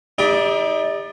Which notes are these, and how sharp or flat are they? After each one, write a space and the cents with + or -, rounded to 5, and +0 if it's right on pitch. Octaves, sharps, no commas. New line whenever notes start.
D#4 +40 G4 +40 D5 +0